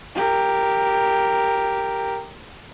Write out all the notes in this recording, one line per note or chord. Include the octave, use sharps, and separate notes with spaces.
G4 A#4